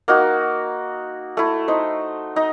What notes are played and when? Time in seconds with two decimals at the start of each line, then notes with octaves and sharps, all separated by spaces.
0.08 A#3 D#4 F#4
1.37 A3 E4
1.68 D#4 C5
2.36 D#4